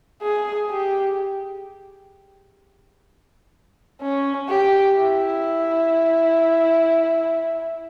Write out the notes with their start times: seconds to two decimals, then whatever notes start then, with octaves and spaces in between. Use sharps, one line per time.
0.22 G#4
0.70 G4
4.02 C#4
4.49 G4
4.97 E4